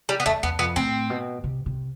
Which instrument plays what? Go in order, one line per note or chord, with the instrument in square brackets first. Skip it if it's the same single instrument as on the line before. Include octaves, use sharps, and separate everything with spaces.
[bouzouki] G3
B3
[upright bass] E2 [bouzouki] A3
[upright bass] E2 [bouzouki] B3
[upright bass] F2 [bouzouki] B3
[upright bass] A2 [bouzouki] C4
[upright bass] B2
C3
C3